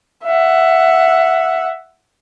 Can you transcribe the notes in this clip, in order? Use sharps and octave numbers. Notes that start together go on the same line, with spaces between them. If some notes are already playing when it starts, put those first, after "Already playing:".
E5 F#5